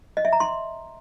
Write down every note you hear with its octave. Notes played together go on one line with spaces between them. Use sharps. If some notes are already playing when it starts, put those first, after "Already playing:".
D#5
E5
A#5
C6